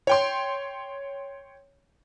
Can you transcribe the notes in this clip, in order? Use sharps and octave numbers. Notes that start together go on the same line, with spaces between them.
C#5 G5 C6